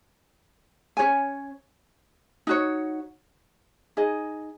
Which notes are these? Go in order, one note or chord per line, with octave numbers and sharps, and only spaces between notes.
C#4 F#4 C#5 G#5
D#4 F#4 C#5
D#4 G#4 D#5